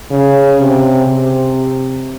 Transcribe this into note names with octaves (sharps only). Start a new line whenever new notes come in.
C#3
C3
C3